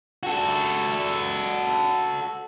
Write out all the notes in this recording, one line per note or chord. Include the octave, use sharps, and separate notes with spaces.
F#4 A4